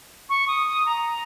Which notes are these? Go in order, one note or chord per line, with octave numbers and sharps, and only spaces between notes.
C#6
D#6
A#5